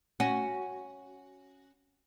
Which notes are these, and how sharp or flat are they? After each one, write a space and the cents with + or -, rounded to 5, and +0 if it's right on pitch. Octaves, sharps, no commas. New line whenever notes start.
C#4 +0 F#4 +0